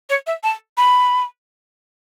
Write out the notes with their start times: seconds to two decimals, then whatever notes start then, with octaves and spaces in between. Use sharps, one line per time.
0.10 C#5
0.27 E5
0.43 A5
0.77 B5